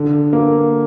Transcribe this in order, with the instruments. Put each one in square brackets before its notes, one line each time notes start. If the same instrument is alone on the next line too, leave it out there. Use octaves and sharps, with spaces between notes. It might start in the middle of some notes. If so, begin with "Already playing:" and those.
Already playing: [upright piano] D3
A#3